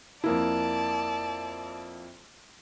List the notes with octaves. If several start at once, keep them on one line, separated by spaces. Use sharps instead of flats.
F2 A#3 E4 D5 A5